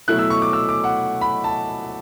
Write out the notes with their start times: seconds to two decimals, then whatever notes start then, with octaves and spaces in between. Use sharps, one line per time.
0.08 B2 F#3 A3 E4 F#6
0.19 E6
0.30 C#6
0.42 D6
0.53 E6
0.69 D6
0.84 F#5
1.21 B5
1.44 A5